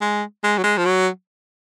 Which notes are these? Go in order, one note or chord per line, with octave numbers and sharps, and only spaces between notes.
G#3
G#3
F#3
G#3
F3
F#3